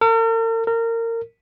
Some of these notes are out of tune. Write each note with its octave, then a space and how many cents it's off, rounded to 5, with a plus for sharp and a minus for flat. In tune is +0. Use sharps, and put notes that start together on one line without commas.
A#4 -45
A#4 -25